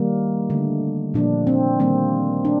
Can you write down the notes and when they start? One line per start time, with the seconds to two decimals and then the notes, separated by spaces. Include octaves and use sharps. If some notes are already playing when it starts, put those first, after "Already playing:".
Already playing: D#3 G3 A#3
0.50 D3 A3
1.14 A#2 F3 A#3 D4
1.47 C4
1.80 D#3 G3 A#3 C4
2.45 D4